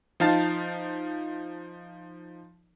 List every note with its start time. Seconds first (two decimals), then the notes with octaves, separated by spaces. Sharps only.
0.20 F3 D#4 F5 A5 A6